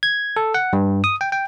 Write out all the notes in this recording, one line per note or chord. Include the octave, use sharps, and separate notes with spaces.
G#6
A4
F#5
G2
D#6
G5
G5